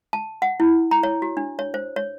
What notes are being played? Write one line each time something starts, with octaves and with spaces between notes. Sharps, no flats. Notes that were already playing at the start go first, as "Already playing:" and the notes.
A5
F#5
E4
A#5
C#5
F#4
D4
C#5
C5
C#5